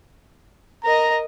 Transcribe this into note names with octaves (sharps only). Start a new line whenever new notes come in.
A#4 D#5 A#5